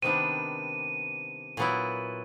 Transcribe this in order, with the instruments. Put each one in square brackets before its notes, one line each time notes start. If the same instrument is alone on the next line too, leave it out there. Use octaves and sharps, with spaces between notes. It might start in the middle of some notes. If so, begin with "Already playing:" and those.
[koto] C3 D#3 G3 B3 D4 [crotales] D#7
[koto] A#2 F#3 B3 E4